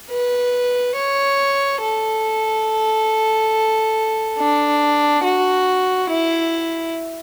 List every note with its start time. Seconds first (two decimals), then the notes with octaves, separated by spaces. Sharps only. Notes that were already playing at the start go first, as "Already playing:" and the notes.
0.10 B4
0.96 C#5
1.82 A4
4.38 D4
5.24 F#4
6.10 E4